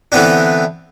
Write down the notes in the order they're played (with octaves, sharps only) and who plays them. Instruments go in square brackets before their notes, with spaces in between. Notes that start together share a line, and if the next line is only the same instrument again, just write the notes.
[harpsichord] D3 E3 B3 C4 D4